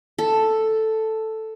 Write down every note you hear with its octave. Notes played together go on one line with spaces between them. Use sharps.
A4